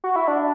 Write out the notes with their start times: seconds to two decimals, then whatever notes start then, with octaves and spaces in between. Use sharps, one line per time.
0.04 F#4
0.16 E4
0.28 D4